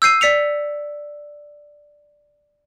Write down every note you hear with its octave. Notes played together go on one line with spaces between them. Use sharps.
E6 G6 C7 D#7
D5 B6 C#7 F7